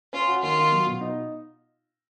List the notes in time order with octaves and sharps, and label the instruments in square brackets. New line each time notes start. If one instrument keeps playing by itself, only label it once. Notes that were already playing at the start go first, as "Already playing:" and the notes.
[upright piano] C#4 [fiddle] F4
[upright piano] F#4
[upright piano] D#3 [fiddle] F4
[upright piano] D#3
F#3
B2
D#4